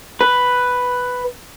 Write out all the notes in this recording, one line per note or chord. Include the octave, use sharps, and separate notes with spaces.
B4